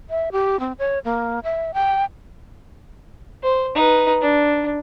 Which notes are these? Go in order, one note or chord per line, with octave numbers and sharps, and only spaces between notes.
E5
G4
C4
C#5
A#3
E5
G5
C5
D#4 B4
D4